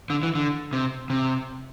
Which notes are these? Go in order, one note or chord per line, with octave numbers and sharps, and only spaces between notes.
D3
E3
D3
C3
C3